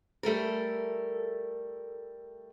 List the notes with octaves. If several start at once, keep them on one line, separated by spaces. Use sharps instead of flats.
G3 A3 A4 A#4